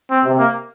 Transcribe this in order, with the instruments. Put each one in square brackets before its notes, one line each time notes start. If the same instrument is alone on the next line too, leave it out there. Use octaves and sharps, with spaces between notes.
[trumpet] C4
[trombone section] C3
[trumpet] A#3